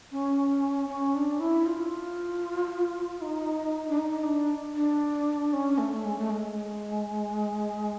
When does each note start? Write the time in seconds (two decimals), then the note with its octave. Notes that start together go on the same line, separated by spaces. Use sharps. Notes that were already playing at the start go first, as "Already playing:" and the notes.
0.12 C#4
0.89 C#4
1.15 D4
1.40 E4
1.66 F4
3.21 D#4
3.89 D4
3.98 D#4
4.24 D4
4.75 D4
5.53 C#4
5.78 A3
5.93 A3
6.05 G#3
6.19 A3
6.30 G#3